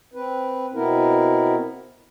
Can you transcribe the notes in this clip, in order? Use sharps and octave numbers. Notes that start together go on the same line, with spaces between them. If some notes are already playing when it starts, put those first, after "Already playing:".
C4 B4
B2 B3 C4 E4 A#4